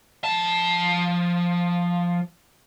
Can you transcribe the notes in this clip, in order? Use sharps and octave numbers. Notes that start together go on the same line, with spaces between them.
F3 A5